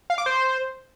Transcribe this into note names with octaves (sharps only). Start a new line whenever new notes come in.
F5
D6
C5